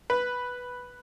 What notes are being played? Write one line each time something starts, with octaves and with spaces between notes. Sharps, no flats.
B4